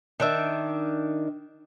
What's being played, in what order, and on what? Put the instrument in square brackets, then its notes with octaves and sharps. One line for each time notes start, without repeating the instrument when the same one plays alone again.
[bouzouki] D#3 D4 E5